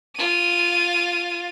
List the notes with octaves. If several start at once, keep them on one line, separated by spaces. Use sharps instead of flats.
F4 D#7